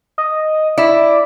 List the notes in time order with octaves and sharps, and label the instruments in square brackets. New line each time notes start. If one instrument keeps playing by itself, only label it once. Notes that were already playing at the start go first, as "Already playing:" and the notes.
[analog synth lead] D#5
[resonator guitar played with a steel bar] E4 [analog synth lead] D5